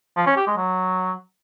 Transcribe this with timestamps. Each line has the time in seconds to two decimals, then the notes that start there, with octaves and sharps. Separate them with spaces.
0.16 F3
0.27 C#4
0.37 G4
0.47 G#3
0.57 F#3